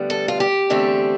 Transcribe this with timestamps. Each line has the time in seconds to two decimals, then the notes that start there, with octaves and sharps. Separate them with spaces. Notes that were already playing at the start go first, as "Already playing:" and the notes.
Already playing: D2 D3 G3 B3
0.10 A4
0.28 F4
0.40 G4
0.70 E2 D3 A3 C4